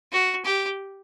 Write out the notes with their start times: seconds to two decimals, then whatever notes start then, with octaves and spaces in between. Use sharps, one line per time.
0.12 F#4
0.45 G4